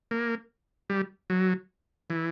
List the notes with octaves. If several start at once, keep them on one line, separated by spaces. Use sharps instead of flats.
A#3
G3
F#3
E3